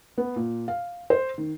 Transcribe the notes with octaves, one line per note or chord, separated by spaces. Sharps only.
B3
A#2
F5
C5
D#3